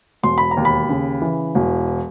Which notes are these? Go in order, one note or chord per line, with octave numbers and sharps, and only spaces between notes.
E1 C6
B5
A#5
D#2
B5
C#3
E3
E1